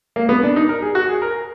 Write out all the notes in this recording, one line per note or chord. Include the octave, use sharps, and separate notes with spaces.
A#3
B3
D4
D#4
A#4
G#4
F#4
G#4
A#4